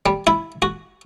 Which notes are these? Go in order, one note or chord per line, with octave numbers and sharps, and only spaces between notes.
G3
E4
F#4